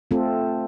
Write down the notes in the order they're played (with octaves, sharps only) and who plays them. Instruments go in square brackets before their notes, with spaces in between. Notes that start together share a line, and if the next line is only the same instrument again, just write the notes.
[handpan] A3 C4 F4 A4